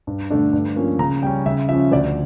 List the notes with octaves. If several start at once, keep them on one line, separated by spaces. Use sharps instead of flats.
G2
D3 A3 D4
G2
F3 A#3 C#4
C#3 A#5
G3 C#4 G5
C#3 E5
F3 C#4 E5
D2 D5